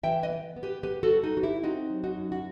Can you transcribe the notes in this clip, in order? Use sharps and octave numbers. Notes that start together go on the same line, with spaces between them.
E3 E5 G5
B4 D#5
B3
B3
G4 B4
B3 G4 B4
F#4 A4
G3
D#4 F#4
B3 F#4
E4 G4
C4 D#4 F#4
F#3
D#4 F#4
F#2
F#4